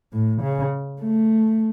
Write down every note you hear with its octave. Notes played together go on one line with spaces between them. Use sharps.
A2
C#3
A3